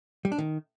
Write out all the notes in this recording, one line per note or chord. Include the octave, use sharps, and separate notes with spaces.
G3
D4
D#3